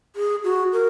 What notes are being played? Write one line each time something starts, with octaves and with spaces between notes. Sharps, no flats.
G#4
F#4
A#4